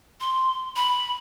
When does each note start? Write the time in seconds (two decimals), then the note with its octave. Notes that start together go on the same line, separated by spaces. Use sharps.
0.20 C6
0.76 B5